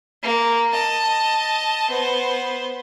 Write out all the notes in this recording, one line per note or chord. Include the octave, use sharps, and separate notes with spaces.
A#3
D#5 A5
B3 C5